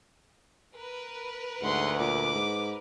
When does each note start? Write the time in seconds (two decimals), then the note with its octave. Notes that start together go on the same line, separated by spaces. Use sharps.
0.74 A#4 B4
1.61 D2 G#2 F#5 C6
2.00 A#2 D6
2.35 G#2